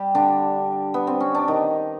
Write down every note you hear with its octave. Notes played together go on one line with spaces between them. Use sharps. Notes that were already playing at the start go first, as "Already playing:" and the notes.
Already playing: G3 G4
D3 D4
B3
C4
C#4
D4
D#3 D#4